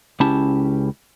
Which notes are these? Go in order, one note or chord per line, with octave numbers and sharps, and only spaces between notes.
C#2 C#4 E4 G4 A5